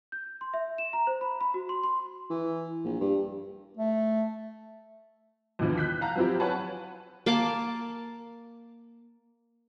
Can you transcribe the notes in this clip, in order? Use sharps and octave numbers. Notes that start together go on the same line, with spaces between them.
G6
C6
E5
E7
A#5
C5
B5
B5
F#4
C6
C6
E3
A#1
G2
A3
D#2 B2 D3 E3 F3
F#6 G6 B6
F5 F#5 A5 A#5
F3 F#3 C4 E4 G4
B4 C#5 F#5 G#5 A5 B5
A#3 F5 A5 D6